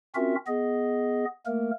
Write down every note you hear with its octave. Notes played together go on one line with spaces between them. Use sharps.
C4 C#4 F4 F#4 A#4 E5
B3 G#4 D#5
A3 A#3 A#4